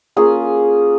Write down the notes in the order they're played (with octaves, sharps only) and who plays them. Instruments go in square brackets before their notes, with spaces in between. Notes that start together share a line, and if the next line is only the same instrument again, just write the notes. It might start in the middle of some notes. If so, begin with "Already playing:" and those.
[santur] A#3 C#4 F4 G#4